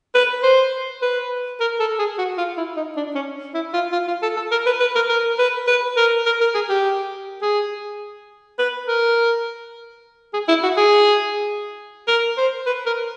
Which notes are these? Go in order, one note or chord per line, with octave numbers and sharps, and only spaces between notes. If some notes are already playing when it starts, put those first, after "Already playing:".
B4
C5
B4
A#4
A4
G#4
F#4
F4
E4
D#4
D4
C#4
E4
F4
F4
F4
A4
A4
A#4
B4
B4
A#4
A#4
B4
B4
A#4
A#4
A#4
G#4
G4
G#4
B4
A#4
G#4
E4
F#4
G#4
A#4
C5
B4
A#4